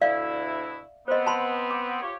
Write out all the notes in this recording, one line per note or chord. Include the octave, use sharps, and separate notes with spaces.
D2 B2 E4 D5 E5 F5
B3 C4 C5 D#5
A5 B5 C6
D6
F4 G4 C#5